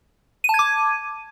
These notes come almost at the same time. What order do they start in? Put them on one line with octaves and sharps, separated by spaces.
D#7 A5 G#6 D6